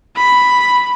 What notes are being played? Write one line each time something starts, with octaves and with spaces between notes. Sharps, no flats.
B5